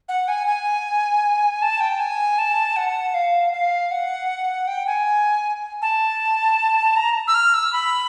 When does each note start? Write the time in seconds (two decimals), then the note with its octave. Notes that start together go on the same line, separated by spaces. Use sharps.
0.09 F#5
0.28 G#5
0.47 G#5
1.62 A5
1.80 G5
2.00 G#5
2.38 A5
2.76 F#5
3.14 F5
3.53 F5
3.91 F#5
4.67 G5
4.87 G#5
5.82 A5
6.96 A#5
7.27 E6
7.34 F6
7.54 E6
7.73 B5